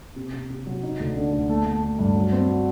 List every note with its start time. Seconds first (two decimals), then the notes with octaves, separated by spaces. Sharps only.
0.16 C3
0.33 C3
0.50 C3
0.67 F#3
0.83 D#4
1.00 D2
1.16 D3
1.33 D2
1.49 A3
1.66 A3
1.83 A3
1.99 G2
2.16 F#3
2.32 C4
2.49 F#4